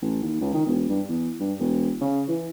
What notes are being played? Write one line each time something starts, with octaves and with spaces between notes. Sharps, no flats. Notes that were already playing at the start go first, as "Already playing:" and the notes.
A1
D#2
C#2
D#3
E1
G2
E2
G2
E1
C#3
E3